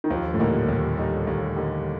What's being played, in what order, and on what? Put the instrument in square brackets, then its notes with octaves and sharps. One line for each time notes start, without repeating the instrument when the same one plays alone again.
[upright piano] D#3
[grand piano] D#2 [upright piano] F3
[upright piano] A2
[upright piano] A#2 [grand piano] D3 G3 A#3 D#4
[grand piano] D#2
D3 G3 A#3 D#4
D#2
D3 G3 A#3 D#4